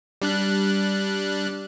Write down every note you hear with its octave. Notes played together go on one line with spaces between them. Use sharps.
G3 D4 F#6